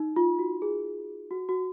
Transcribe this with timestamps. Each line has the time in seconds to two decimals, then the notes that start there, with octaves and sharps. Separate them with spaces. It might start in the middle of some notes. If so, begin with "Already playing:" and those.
Already playing: D#4
0.16 F4
0.39 F#4
0.62 G#4
1.31 F#4
1.49 F#4